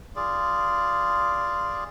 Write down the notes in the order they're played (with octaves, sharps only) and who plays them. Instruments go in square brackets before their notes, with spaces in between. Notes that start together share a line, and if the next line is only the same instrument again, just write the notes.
[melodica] F4 G#4 D5